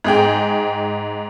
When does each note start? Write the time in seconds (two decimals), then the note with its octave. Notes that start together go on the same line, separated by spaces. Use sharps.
0.04 G#2 G#4 G5